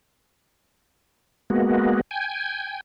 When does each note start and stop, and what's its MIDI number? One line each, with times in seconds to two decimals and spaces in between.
1.50 2.01 56
1.50 2.01 58
1.50 2.01 59
1.50 2.01 66
2.11 2.80 79
2.11 2.80 80